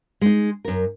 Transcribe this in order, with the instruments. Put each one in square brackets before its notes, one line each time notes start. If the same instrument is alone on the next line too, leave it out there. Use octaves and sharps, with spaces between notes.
[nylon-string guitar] G#3 D#4
F#2 A#4